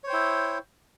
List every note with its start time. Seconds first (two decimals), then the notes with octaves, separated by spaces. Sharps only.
0.04 C#5
0.07 C5
0.10 G5
0.13 E4